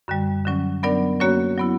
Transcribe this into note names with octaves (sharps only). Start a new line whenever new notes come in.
F#2 D3 G3
D3 F#3 C#4
F#3 B3 D4 A#4 D5
F#3 A#3 C#4 F#4 C#5
F#3 B3 E4